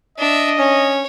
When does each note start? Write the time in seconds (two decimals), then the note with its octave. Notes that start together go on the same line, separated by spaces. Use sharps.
0.18 D4 D#5 E5
0.58 C#4 C#5